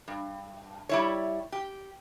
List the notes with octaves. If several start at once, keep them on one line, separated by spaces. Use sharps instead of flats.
G2
G3 E4 C#5
G4